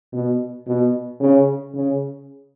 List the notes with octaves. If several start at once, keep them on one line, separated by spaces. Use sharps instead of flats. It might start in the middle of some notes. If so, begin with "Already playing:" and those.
B2
B2
C#3
C#3